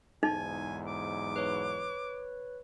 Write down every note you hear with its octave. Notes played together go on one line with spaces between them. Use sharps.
B1 E2 G#2 D#4 G#5
D6
B4 C#5